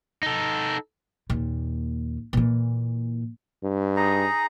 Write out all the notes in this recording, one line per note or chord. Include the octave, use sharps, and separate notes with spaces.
D#4 A4
D#2 A#2
A#2 E3
G2
D#4 G#4 A#5